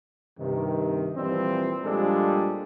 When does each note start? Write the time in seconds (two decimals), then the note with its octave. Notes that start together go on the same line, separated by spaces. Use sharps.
0.39 G2 C3 D#3
1.15 A#2 E3 F3 G3 C4
1.84 A#2 F3 G3 G#3 D4 A4